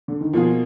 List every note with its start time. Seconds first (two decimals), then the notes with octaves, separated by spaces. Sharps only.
0.08 D3
0.21 D#3
0.33 B2 F3 A#3 F4 G#4